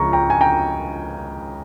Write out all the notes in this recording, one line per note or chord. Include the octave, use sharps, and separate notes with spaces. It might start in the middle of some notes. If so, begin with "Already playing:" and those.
Already playing: C#2 C#3 F3 A#5 C#6
G5 A#5
G#5
G5 A#5